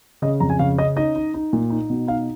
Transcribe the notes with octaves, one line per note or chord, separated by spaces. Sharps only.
C#3 D#5
F2 A#5
G#5
C#3 F5
C#4 D#5
D#4 D#5
D#4
D#4
A#2
D#4
B2
D#4 F5